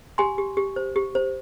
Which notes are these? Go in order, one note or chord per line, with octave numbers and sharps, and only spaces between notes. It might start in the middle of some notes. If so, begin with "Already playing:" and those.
G4 G#5 C6
G4
G4
C5
G4
C5